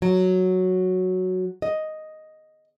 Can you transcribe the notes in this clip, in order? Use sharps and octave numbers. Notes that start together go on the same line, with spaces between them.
F#3
D#5